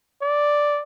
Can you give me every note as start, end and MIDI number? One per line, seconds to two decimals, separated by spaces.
0.22 0.82 74